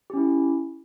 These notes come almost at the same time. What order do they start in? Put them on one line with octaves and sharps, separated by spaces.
G4 C#4 E4